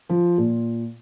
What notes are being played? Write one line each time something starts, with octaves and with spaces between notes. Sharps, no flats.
F3
A#2